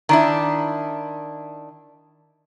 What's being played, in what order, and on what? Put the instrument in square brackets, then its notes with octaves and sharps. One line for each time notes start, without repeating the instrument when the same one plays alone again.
[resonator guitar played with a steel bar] D#3 D4 E4